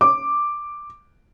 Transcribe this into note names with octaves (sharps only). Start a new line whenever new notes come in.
D6